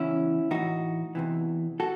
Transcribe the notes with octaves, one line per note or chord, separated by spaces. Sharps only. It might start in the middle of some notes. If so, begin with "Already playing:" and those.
Already playing: E2 C#3 E3 C#4 E4
A2 E3 D#4 F#4
E2 C3 E3
F#4 A4